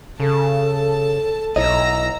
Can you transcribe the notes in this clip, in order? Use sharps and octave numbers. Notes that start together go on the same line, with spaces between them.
C#3 A4 A5
B1 E4 C#5 D#5 A#5 E6